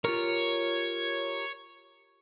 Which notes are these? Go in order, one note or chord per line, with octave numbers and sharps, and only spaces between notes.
F4 G4 A#4 C#5